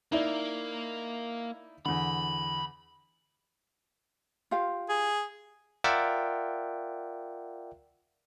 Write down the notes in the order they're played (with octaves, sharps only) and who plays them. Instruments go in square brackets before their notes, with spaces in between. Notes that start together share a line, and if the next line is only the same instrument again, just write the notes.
[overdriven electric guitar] A#3 [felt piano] D#4 E4 D5
[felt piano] E2 D3 [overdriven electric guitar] B5
[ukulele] F4 G4 F5
[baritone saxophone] G#4
[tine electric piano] F4 A#4 D5 E5 F#5 G5